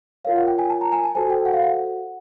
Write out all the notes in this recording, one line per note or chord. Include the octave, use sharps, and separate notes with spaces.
F4 A#4 C#5 F5
F#5
G5
G#5
A5
A#5
G#5
A5
F#4 A4 C5 G#5
G5
F#5
F5
F#5